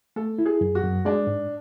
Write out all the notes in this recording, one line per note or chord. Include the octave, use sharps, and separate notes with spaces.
A3 A4
E4
G#4
F#2
F#4
F#2
G#3 D4
G#2